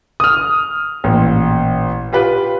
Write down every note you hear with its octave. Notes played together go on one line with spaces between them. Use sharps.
D#6 F6
A1 A#2
F4 G4 B4